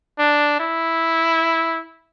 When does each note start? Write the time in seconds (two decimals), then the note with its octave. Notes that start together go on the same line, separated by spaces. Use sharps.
0.19 D4
0.60 E4